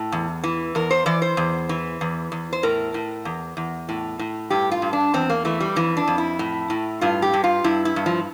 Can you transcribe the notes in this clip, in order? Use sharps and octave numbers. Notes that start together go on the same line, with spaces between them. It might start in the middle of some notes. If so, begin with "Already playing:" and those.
Already playing: A2
E2
E3
E2 A#4
C5
E3 D5
C5
E2
E3
E2
E2
C5
A2 A#4
A2
E2
E2
A2
A2
G2 G4
F4
G2
D4
E2 C4
A#3
E3 A3
G3
F2 E3
D4
F2
E4
A2
A2
G2 F4
G4
G2
F4
G2 E4
E4
G2
F3